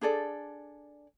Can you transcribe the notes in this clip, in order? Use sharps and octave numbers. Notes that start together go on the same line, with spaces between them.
D4 G#4 A4 D5